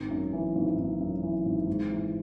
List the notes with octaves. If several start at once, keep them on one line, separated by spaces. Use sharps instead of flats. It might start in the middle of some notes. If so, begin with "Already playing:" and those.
Already playing: G#1
F#2
E3
G#1
G#1
F#2
E3
G#1
G#2
E3